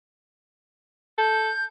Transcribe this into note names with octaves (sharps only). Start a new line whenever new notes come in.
A4 G6